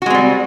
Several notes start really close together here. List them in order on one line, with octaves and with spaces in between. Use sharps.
F#4 G#3 C4 G3